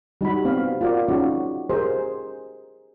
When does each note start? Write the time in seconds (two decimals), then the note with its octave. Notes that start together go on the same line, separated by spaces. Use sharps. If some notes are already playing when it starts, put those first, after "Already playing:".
0.21 G3 D#4 F#4 B5
0.45 B3 C4 F5
0.81 F4 F#4 A#4 D5
1.08 C#4 D#4 F4 F#4 G#4
1.69 G4 G#4 A#4 C5 D#5